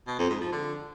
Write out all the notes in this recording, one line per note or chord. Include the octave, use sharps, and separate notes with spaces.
B2
F2
G#2
F3
D3